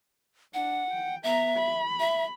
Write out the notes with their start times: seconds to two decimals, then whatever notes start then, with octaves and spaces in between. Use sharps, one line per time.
0.54 D4 F#5
0.91 G5
1.23 B3 E5 A#5
1.57 B5
2.00 E5